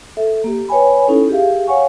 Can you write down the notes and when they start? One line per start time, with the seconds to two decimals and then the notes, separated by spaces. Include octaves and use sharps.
0.17 A4 E5
0.44 A#3 G4
0.69 B4 C#5 G5 G#5 B5
1.08 C#4 D#4 E4 A4
1.29 G4 G#4 E5 F5
1.67 C#5 F5 F#5 G#5 C#6